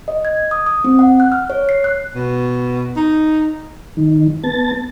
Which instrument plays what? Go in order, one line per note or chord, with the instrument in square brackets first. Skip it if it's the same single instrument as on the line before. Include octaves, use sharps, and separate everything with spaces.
[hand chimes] D#5
G#6
D#6
D#6
C4
F#5
F#6
F6
C#5
C7
F#6
[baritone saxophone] B2
D#4
[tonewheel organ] D#3
B3 A5 A6